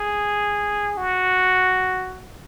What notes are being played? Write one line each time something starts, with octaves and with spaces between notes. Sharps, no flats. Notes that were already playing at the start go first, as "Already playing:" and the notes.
Already playing: G#4
F#4